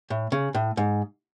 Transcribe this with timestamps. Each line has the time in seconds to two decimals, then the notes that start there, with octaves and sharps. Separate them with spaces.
0.10 A2
0.32 C#3
0.55 A2
0.77 G#2